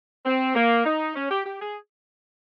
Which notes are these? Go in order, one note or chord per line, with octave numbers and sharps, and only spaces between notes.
C4
A#3
D#4
C#4
G4
G4
G#4